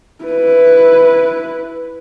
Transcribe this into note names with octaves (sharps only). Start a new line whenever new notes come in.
E4 B4